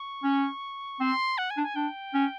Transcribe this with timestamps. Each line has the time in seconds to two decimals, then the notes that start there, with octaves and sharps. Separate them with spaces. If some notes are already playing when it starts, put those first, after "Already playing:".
Already playing: C#6
0.24 C#4
1.00 C4 C6
1.38 F#5
1.50 G#5
1.57 D4
1.63 G#5
1.76 D4 G5
2.14 C#4